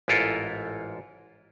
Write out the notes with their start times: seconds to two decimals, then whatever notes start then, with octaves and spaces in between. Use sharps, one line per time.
0.08 A1 G#2 E4 F4 A4 A#4